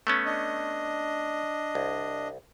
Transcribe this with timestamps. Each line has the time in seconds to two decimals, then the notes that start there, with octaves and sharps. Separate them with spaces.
0.07 A3 B3 C#4
0.26 D4 D#5
1.75 C2